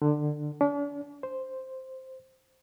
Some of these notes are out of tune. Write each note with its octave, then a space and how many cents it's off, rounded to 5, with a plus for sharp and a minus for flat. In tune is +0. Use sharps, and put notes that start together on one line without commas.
D3 +20
D4 -40
C5 +0